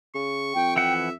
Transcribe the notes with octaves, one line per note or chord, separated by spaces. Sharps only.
C#3 C#6
F2 G5
E3 E5 F#5